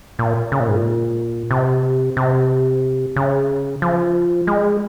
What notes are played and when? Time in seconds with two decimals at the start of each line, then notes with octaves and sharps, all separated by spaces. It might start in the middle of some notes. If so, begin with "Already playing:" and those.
0.19 A#2
0.52 C#3
0.60 A#2
0.68 G#2
0.76 A#2
1.51 C3
2.17 C3
3.16 C#3
3.82 F3
4.47 G#3